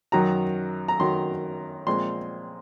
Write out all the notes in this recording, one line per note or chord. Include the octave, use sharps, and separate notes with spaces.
F#2 D#3 F#3 A#5
A#5
F#2 D#3 F#3 C6
A#2 F3 G#3 C4 C6